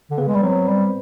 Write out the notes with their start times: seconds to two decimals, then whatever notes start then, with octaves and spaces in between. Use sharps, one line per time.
0.11 D3
0.18 C#3 B3 B4
0.28 G#3
0.35 G3
0.43 F#3 C4 C5
0.68 G3